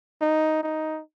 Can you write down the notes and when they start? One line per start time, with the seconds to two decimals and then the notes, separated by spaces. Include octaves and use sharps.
0.21 D#4
0.63 D#4